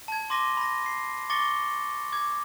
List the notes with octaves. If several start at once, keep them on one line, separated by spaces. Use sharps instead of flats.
A5 G#6
C6 D6 A#6 D#7 G7
B5 A#6
C7
C#6 D6 A6 A#6 C#7 G7
D6 G#6